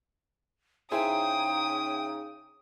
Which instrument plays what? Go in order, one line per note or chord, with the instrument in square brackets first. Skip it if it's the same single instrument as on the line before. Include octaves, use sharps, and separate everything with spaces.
[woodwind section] C#3 D#4 [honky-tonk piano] E4 G#4 C5 [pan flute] G5 [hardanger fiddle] D#6